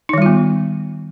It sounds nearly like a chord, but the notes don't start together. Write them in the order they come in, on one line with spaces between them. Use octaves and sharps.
D#4 D#3 G3 F4 B3